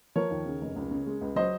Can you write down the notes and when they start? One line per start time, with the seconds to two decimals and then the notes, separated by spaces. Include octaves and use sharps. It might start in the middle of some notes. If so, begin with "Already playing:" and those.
0.16 F3 A#4 C#5
0.31 D#2
0.46 C#3
0.61 F1
0.76 C#2
0.91 C#3
1.06 G#3
1.21 C#2
1.36 F#3 C5 D#5